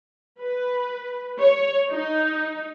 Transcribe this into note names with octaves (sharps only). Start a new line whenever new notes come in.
B4
C#5
D#4